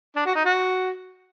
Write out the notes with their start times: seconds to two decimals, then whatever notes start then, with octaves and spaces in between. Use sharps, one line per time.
0.16 D4
0.26 F#4
0.35 D#4
0.45 F#4